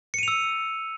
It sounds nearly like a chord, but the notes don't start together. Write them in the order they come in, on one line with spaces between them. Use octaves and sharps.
C#7 D#7 F7 E6